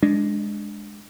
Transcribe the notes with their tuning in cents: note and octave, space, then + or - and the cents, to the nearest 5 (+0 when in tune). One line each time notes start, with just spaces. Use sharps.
G#3 +0 D4 +0